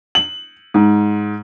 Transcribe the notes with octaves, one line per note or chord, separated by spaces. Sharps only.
F#7
G#2